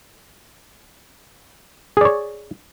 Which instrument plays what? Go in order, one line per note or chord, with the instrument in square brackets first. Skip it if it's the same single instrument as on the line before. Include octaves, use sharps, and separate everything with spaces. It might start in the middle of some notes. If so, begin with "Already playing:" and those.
[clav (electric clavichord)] G#4
D5
C#5